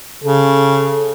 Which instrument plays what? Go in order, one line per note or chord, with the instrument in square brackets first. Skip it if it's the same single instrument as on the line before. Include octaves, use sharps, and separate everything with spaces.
[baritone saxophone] C#3 [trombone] A4